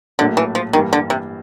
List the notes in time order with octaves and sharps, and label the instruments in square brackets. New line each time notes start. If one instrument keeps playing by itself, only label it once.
[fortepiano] A#1 A2 F#3 A#3 [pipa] D3
[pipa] E3
F3
[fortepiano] G2 E3 G3 A#3 [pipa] D#3
[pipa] D3
C3